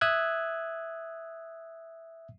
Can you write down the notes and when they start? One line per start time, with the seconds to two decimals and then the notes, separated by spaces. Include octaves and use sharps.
0.01 E5 D#6 E6 F#6 G#6